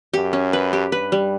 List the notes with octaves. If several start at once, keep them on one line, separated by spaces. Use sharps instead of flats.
F#2 G4
C#4
B4
G4
G2 B4
G3